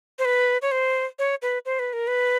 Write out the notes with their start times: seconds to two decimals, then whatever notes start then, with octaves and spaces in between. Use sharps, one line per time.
0.19 C5
0.25 B4
0.62 C#5
0.71 C5
1.19 C#5
1.42 B4
1.66 C5
1.79 B4
1.93 A#4
2.07 B4